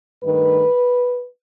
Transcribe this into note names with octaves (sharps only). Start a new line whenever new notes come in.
G2 D#3 A3 B4